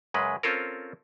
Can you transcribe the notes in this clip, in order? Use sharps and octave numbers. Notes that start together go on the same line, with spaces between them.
F#2 C#3 G#3 B4
C4 C#4 F4 A4 A#4